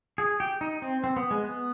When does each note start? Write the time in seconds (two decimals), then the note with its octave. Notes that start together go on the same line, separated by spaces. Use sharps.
0.18 G#4
0.40 G4
0.61 D#4
0.82 C4
1.04 C4
1.17 B3
1.31 G#3
1.44 B3